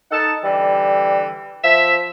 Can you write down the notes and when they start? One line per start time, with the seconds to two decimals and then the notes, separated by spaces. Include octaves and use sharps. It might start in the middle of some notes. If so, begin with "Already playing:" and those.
0.12 D#4 A4 F#5 A5
0.43 D3 E3 G3
1.64 F3 E5